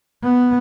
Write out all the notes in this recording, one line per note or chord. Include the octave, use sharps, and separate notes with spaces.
B3